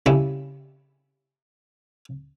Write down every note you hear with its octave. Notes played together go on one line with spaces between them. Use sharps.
C#3 G3 C#4 E4